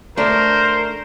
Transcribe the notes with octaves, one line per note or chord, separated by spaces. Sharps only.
A3 D4 A#4 C5